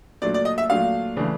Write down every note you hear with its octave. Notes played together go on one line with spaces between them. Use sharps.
A#2 F#3 A3 D4 D5
D5
D#5
E5
A#2 F#3 A3 D4 F5
C#3 E3 A3 D4